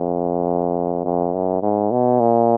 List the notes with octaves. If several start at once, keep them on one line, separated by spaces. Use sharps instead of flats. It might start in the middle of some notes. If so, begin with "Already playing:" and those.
Already playing: F2
F2
F#2
G#2
B2
A#2